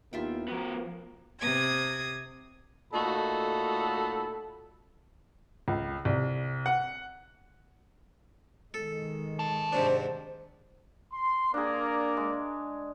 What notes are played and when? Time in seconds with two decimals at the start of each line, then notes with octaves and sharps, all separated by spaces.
0.13 D#2 A#3 B3 E4 F4 E5 G5
0.48 F3 B3 F#4 A#4
1.40 C3 D#6 G#6
2.93 A#2 A3 D#4 F#4 A4 B5
5.68 C#2
6.05 C2
6.66 F#5
8.74 D#3 G#3 A4
9.39 C#5 A5
9.72 G#2 C3 D4 C5
11.13 C6
11.54 A#3 D4 G#4 A#4 D5
12.17 G#3